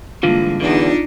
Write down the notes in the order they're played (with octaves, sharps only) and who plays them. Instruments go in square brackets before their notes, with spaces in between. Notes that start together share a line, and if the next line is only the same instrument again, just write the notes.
[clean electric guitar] G2 D3 E3 [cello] G#3 A#3 [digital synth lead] F4
[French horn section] E2 [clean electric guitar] D3 [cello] D4 D#4